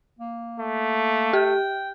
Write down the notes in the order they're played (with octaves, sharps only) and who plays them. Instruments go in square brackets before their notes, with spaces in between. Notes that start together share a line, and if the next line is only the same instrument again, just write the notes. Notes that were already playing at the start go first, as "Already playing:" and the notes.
[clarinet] A#3
[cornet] A3
[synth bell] G4 [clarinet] G5